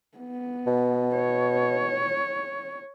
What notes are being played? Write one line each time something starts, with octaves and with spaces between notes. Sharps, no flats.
B3
B2
C#5